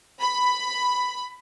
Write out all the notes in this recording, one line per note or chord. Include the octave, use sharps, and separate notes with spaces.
B5